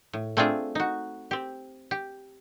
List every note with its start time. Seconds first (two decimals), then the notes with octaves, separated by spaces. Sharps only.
0.13 A2
0.37 A3 C4 D4 F4 G#4
0.75 D#4 F#4
1.31 C4 G4
1.91 G4